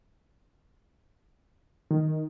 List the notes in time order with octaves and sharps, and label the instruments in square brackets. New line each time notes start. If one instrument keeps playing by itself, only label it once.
[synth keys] D#3